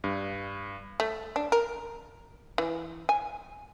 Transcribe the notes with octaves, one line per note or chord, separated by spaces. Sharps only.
G2
A3
D4
A#4
E3
G#5